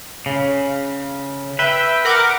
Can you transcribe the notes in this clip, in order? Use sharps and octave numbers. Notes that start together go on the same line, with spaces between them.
C#3
B4 E5 G5
A#4 F#5 D6